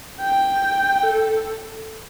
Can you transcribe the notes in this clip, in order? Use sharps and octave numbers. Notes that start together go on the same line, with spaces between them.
G5
A4